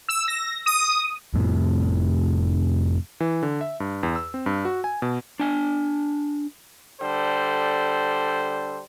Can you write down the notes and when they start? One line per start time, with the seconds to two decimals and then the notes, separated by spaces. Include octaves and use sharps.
0.09 E6
0.28 A#6
0.66 D#6
1.34 F2 A2 C3
3.20 E3
3.43 D3
3.61 E5
3.80 G2
4.03 E2
4.16 E6
4.34 C4
4.46 G2
4.65 F#4
4.84 G#5
5.02 B2
5.40 D4 G#5
7.00 D3 G3 A4 C5